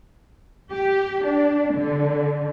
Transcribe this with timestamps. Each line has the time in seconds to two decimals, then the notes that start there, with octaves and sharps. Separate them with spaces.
0.72 G4
1.25 D4
1.74 D3